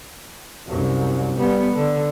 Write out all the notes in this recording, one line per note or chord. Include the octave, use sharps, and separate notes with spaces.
C2 F#2
G3 B3
D3